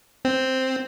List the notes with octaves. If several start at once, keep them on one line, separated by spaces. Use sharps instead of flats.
C4